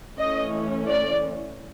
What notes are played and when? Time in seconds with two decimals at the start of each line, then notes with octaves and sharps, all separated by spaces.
0.18 E3 A3 C#4 D#5
0.87 D5